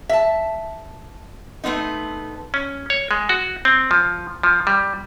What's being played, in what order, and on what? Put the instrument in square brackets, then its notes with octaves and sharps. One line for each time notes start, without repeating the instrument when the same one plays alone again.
[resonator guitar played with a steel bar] E5 A5
A3 B3 C4 D#4
[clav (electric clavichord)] C#4
C#5
G#3
F#4
C4
F3
F3
G3